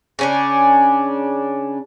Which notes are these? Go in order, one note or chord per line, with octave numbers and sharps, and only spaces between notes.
C#3 C#4 D4